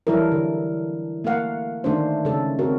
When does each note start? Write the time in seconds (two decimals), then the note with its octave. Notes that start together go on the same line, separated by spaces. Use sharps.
0.07 E3 F#3 G3 E4 A4 A#4
0.32 D3
1.24 A3 A#3 A#4 F5 F#5
1.84 D3 D#3 A3 D4 D#4 C5
2.25 C#3 G#3 A4
2.59 C4 F#4 A#4